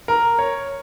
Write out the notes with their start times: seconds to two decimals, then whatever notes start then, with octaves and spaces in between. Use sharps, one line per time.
0.08 A#4
0.39 C#5